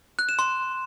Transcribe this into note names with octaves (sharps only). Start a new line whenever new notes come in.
F#6
E7
C6